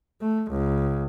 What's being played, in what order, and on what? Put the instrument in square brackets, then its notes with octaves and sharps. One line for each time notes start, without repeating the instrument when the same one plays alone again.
[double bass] A3
C#2